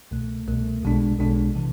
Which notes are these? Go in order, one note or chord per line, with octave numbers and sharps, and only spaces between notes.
C2 B2 A3
C2 B2 A3
B1 B2 G#3 D4
B1 B2 G#3 D4
C3 E3